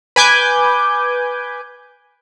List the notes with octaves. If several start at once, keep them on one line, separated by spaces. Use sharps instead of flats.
B4 G#5 D6 G6